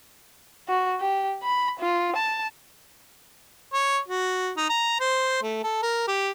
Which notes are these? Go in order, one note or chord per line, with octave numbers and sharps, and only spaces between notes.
F#4
G4
B5
F4
A5
C#5
F#4
D#4
A#5
C5
A3
A4
A#4
G4